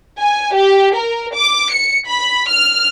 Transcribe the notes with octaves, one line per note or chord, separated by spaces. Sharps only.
G#5
G4
A#4
D6
C#7
B5
F6